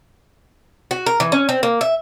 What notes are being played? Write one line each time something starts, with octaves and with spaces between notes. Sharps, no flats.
F#4
A#4
E3
C#4
C4
A#3
E5